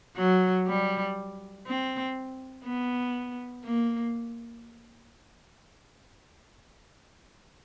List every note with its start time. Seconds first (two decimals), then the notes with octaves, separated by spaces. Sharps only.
0.16 F#3
0.66 G3
1.66 C4
2.65 B3
3.65 A#3